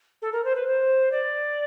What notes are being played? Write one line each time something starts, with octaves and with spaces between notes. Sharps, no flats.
A4
A#4
C5
B4
C5
D5